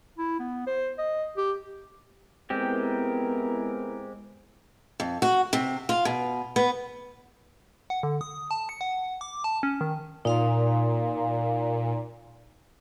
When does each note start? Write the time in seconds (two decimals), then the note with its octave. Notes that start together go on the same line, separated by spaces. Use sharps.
0.18 E4
0.39 B3
0.67 C5
0.98 D#5
1.37 G4
2.50 G#3 B3 C4 E4 G4 A#4
5.00 F2
5.22 F#4
5.53 C3
5.89 F4
6.05 B2
6.56 B3
7.90 F#5
8.03 D3
8.21 D#6
8.51 A5
8.69 C#7
8.81 F#5
9.21 D6
9.44 A5
9.63 C#4
9.81 D#3
10.25 A#2 D#4 F5 C6